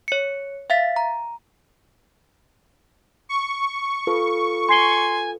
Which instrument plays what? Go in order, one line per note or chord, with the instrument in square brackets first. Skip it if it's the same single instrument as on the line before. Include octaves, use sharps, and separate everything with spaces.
[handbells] C#5 C#7
E5 F5 A6 B6
A#5
[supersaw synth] C#6
[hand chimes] F4 A4 B4
[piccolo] G#5 [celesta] C6 C7 G7